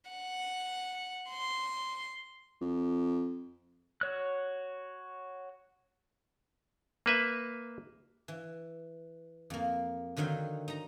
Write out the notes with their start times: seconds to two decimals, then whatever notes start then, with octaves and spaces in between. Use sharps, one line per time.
0.11 F#5
1.29 C6
2.61 F2
4.01 F#4 C#5 F#6
7.06 A#3 B4 E5
8.28 E3
9.50 F2 A#3
10.17 D3 D#3 F#3 F5 G5
10.68 D#4 A#5